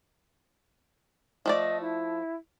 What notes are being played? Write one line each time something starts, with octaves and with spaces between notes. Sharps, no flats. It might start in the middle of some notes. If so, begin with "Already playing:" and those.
F3 A3 D5 D#5
E4